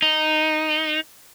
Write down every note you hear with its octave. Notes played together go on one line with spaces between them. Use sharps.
D#4